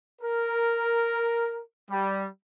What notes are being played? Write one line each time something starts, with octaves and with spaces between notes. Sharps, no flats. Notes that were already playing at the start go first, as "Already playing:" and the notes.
A#4
G3